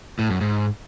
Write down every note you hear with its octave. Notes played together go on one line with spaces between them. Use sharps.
A2
F#2
G#2